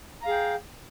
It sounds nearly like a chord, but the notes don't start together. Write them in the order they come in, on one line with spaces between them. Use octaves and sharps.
A#5 F5 G#4 G5